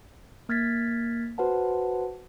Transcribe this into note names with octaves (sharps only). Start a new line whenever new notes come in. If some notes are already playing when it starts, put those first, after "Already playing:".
A#3 F6 G#6 A6 B6
F#4 B4 C5 F#5 A5